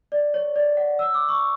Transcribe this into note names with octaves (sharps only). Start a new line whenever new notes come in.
D5
C#5
D5
F#5
E6
D6
C#6